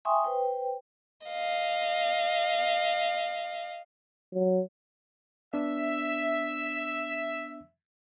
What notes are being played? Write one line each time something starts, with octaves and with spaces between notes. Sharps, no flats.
E5 G5 G#5 C6 C#6 D#6
B4 C5 G5
D#5 F5
F#3
B3 D4 E5